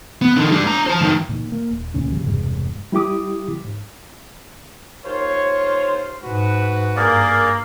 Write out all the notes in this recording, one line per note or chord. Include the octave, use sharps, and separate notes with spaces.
B3
D3 D#3
G3 D4
D4 A#5
C5 A5
G2 D#3
A#2 D#3
A#3
D#1
D2 A#2 C#3 C#4
G#1 C#3 F3 G3
E1 G2 C3 G#3
G3 E4 G4 D6 D#6
G#2
D#2 F4 C5 C#5
G#2 F#4 B4
G2 A#3 G#4 A#4 D5